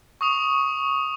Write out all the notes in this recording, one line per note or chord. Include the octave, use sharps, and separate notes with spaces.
C#6 D#6 F7